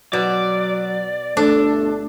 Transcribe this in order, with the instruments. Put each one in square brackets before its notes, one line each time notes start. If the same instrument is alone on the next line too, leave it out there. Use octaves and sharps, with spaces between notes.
[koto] B2 [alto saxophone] F#3 [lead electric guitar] D5
[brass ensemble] G1 A3 [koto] D4 [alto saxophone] A4